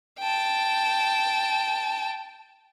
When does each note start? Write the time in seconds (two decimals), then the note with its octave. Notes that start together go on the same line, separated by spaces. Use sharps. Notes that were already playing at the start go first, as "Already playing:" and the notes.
0.19 G5 A5